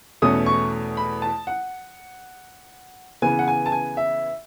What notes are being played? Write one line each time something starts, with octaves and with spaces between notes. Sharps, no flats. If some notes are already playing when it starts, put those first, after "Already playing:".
E2 B2 A3 C#4 D#6
C#6
B5
A5
F#5
C#3 E3 B3 G#5
F#5
G#5
A5
G#5
E5